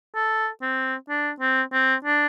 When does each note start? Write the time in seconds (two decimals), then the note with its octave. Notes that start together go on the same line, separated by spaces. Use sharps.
0.15 A4
0.62 C4
1.09 D4
1.40 C4
1.73 C4
2.04 D4